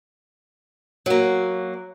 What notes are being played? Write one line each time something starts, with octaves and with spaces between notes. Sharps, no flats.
F#3 A#3